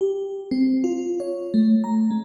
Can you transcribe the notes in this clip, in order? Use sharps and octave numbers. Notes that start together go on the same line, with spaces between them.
G4
C4
F4
C#5
A3
A#5
G#3